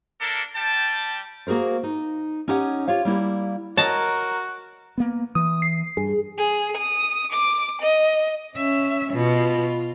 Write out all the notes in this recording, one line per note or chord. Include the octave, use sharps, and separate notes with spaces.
A#3 D4 A4 A#4
G3 G5 A5
A#3 F#4 G#4 A#4 C5
D#4
C#4 D#4 E4 G4 C#5 F#5
F4 G4 C#5 F5
G3 A#3 E4 G4
F#4 A#4 C#5 D#5 A5
A#3 B3
E3 D#6
C7
G2 G#4
G#4
D#6
D6
D#5
C#4 E5
B2 F4